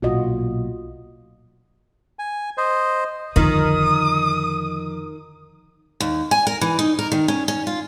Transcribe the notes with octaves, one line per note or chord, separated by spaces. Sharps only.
B1 A#2 F4 F#4 D#5
G#5
C5 D#5
F2 D3 D#3 D#6
D#2
G#5
A#4
E3
D#4
A#4
D#3
C#4
C#4
F4